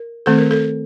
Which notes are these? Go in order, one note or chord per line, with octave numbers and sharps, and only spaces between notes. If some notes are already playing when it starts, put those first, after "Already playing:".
Already playing: A#4
D#3 A3 C4 A4
A#4
A4